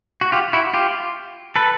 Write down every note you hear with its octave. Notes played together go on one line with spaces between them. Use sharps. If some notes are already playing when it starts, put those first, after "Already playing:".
F#4
F4 G4
E4 F#4
F4 G4
A4 B4